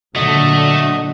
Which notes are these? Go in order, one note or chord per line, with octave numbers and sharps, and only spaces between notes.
A#2 D3 F#3 A3 D4 F#4 D#5